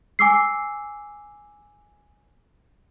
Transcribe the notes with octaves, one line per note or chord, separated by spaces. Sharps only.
G#5 D6 E6 C7